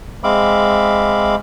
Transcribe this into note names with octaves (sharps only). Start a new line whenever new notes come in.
G#3 C4 E5 F5 B5 D6